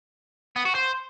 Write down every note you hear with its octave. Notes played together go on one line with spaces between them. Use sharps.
B3
F#4
C5